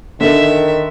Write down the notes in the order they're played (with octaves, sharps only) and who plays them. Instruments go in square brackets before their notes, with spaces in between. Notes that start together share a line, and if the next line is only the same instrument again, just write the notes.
[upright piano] D3 [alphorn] D#3 [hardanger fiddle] E5